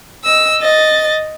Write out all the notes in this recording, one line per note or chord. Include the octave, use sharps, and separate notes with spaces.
D#5 E6
D#5 A6